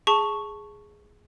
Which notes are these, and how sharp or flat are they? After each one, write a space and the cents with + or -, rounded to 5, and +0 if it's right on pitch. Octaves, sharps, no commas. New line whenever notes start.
G#4 +0 A5 +5 C#6 +0